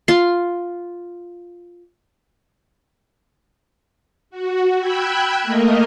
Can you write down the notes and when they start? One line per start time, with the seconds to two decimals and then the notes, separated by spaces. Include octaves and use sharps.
0.08 F4 C6
4.30 F#4
4.79 G5 B5 E6 F#6 G#6
5.42 A3 A#3 A#4 D#5